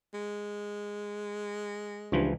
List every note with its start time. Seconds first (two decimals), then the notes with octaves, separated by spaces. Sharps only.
0.14 G#3
2.12 C#2 G2 E3 F3